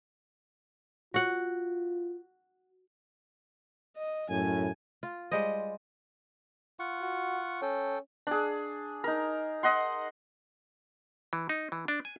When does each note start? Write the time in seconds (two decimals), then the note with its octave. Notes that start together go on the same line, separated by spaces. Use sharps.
1.14 F4 F#4 F#5
3.97 D#5
4.30 F#2 A2 G#5
5.03 F4
5.31 G3 G#3 C5 D#5
6.79 F4 F#5 C#6
7.01 F#4
7.62 C#4 A4 G5
8.27 D4 G#4
9.04 D#4 A#4
9.63 D#5 F#5 C6
11.33 E3
11.49 D#4
11.72 E3
11.88 D4
12.05 G#5